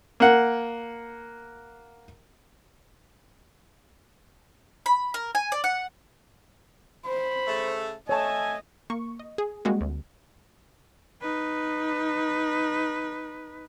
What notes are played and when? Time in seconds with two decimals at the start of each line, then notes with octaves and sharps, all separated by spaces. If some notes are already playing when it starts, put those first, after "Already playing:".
0.20 A#3 F#5
4.86 B5
5.14 A#4
5.35 G#5
5.52 D5
5.64 F#5
7.06 C5 B5
7.47 C#3 A3
8.09 A3 C#5 D#5 G#5 A5
8.90 A#3 C#6
9.19 D#5
9.38 G#4
9.65 G3 G#3 A#3 C4 F#4
9.81 D2
11.22 D#4 B4